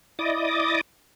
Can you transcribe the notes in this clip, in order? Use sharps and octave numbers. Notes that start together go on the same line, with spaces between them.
E4 D5 D#5 D6 D#6